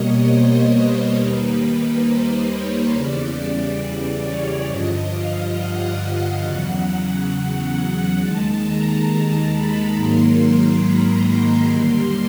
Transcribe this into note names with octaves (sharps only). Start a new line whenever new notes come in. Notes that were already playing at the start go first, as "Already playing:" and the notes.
Already playing: B2 G3 A#3 C#5 D#5
C5
B4
D#2 D#3 G3 A#3
C5
C#5
E2 C#3 E3 G3 D5
D5
C#5
G2 D3 F3 D#5
F5
F#5
E2 C#3 F#3
D#2 D#3 G#3 A5
A#5
A#5
B5
G#2 D#3 F#3 A#3 C6
A#5
B5
D#2 D3 G3 A#3 C6